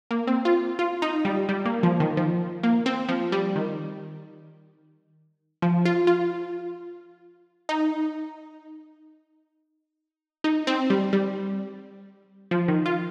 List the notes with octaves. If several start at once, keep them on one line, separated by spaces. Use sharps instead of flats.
A#3
C4
F4
F4
D#4
G3
G3
A#3
F3
D#3
F3
A#3
C4
F3
G3
D#3
F3
F4
F4
D#4
D#4
C4
G3
G3
F3
D#3
F4